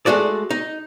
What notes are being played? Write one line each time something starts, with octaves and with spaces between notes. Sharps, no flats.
G#3 A3 F#4 D5
D#4